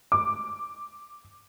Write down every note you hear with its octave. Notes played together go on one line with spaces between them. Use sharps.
D6